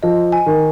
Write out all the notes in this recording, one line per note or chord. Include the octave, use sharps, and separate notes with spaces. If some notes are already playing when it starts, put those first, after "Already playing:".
F3 D#5
G#5
D#3